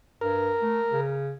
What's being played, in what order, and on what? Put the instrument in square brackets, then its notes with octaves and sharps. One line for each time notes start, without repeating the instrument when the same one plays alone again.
[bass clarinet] G2 [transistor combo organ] A#4
[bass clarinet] A3
C#3